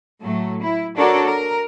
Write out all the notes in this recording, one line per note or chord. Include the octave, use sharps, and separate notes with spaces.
A2 F#3 A3
E4
D4 F#4 A4 A#4 C#5 D5
A#4